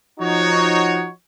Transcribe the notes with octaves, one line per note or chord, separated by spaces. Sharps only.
F3 D#4 F#4 C#5